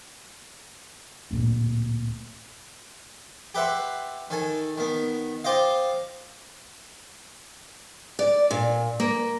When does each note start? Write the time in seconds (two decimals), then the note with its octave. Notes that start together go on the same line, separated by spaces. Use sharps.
1.31 D1 A#2
3.55 G4 B4 E5 F#5 C6
4.30 D#3 A4 G#5
4.77 D#3 B3
5.44 F4 G4 C5 D#5 F5
8.19 D5
8.51 A#2
9.00 A#3